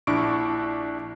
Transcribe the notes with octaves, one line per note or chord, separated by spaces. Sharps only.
A#1 D4 E4 C#6 D6 D7